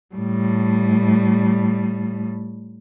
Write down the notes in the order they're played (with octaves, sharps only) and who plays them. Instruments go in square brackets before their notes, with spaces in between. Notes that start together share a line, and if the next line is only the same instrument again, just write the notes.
[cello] A2 G3